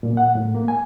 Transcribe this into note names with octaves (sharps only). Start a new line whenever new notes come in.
A#2
F#5
A2
A#3
G#5